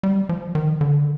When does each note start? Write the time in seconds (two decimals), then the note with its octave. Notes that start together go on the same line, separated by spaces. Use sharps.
0.03 G3
0.29 F3
0.55 D#3
0.81 D3